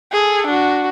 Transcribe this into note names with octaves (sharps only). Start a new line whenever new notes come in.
G#4 A4
D4 F#4